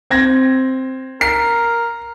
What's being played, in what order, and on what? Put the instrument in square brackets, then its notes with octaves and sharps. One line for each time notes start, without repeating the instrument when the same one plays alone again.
[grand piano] C4 G#6 A#6
[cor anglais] A#4 [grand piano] C7